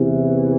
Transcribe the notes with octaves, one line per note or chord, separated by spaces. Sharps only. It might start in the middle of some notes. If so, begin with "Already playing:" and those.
Already playing: E2 C3 E3